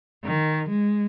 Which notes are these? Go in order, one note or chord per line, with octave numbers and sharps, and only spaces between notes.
D#3
G#3